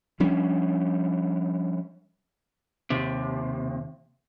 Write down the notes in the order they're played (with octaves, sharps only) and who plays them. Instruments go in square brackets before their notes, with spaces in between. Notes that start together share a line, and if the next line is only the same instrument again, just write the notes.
[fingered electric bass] F3 G3 C#4 D4
[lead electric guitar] D#2 C3